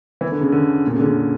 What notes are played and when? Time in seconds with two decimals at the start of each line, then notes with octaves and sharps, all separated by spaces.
0.21 E3
0.31 D3
0.41 C#3
0.52 D3
0.87 A#2
0.94 C#3
1.00 D3
1.04 C#3